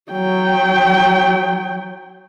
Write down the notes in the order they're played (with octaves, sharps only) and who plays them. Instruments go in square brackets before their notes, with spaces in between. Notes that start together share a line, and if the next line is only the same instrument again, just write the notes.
[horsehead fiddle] F#3 G5